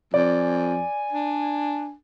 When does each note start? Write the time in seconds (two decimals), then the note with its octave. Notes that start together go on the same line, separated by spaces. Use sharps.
0.14 F2 D5 G#5
1.12 D4